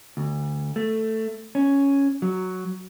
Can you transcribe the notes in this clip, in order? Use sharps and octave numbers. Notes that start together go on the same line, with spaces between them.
D2
A3
C#4
F#3